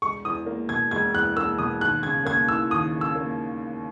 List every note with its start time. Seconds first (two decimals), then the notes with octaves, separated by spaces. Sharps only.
0.02 E1 C#6
0.25 E2 D#6
0.46 A#3
0.69 B2 G#6
0.91 E1 G#6
1.14 E2 F#6
1.36 A#3 E6
1.58 B2 D#6
1.81 D#2 F#6
2.03 C#3 G#6
2.25 A#3 G#6
2.48 E3 E6
2.71 D#2 D#6
2.93 C#3
3.01 E6
3.16 A#3